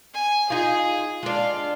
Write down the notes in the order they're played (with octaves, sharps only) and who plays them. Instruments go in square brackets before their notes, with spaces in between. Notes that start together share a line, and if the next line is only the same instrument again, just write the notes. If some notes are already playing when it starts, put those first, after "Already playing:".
[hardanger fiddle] G#5
[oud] D#4 F4 [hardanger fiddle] G#4
[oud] G#3 D4 [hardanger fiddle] F4 F5